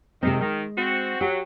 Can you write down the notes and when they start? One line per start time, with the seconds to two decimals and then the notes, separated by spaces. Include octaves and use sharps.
0.23 C3 D#3 G#3 C4
0.41 D#3 G#3
0.78 C4 F#4
1.21 F#3 G4